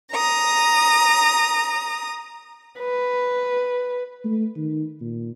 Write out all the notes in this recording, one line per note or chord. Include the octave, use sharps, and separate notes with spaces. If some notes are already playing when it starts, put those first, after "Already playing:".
A#5 D#6
B4
A3
D#3
A#2